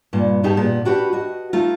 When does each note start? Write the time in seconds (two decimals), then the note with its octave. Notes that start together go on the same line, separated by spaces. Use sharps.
0.13 G2 A#2
0.43 G2 B2 D#4 G4 G#4 A5
0.57 A#2 B3
0.85 D4 F#4 G4 B4
1.13 F#4 D#5
1.53 A3 D#4 F4